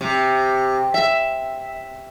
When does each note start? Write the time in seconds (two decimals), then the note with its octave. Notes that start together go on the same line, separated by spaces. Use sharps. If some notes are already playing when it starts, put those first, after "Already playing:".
0.01 C3
0.94 E5